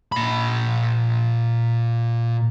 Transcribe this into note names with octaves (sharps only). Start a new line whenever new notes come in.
A#2 B5